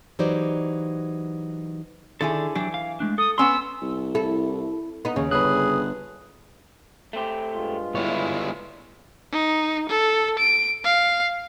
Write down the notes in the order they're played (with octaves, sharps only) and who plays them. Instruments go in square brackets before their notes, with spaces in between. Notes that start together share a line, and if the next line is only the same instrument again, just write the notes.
[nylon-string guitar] E3 F#3 D#4 G4 C5 D5
[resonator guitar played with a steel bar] D3 E4 G#4 [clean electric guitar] D#3 A4
[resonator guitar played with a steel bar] E3 [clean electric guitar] F#3 D4 G4
[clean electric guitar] F5
G#3 A3 D4
[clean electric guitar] A4 [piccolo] D#6
[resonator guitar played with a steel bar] B3 C#4 A#5 [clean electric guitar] C6 [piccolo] E6
[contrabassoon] C2
[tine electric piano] E4 [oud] A4
[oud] B3 D#4
[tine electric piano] D#2 C#4 [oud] C#3
[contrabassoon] G1 [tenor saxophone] G#4 [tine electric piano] B4 F#6
[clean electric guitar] A3 C4 G4
[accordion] G2 G#3 F4
[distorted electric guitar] G3 B3 [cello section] E4 [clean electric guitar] C#5
[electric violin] D#4
A4
D7
F5